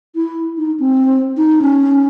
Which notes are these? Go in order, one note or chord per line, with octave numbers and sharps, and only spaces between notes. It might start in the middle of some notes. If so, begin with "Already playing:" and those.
E4
D#4
C4
D#4
C#4